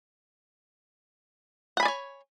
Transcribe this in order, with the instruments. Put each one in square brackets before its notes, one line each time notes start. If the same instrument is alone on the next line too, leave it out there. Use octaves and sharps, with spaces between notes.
[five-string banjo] F#5
B5
G#5
D5
C#5